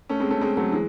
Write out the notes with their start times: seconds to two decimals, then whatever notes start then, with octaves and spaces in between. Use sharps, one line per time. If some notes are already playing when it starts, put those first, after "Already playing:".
0.10 A3 C#4
0.20 G#3 C4
0.31 A3 C#4
0.41 G#3 C4
0.57 F#3 A3
0.72 E3 G#3